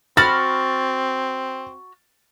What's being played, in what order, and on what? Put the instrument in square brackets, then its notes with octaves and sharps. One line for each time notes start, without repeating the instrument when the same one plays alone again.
[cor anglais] C4 [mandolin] F#4 B5 F6 [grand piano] A6